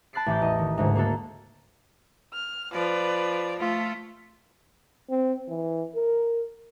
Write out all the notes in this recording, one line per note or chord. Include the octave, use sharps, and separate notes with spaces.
A5 B5 F#6 A6 C7 D7
A1 E3 E4 D6 G6
E2 D#5
D#3
D2 G#2 C#3
A#3 D4 F#4 A4
F6
F3 B4 D5
A3 F4
C4
E3
A#4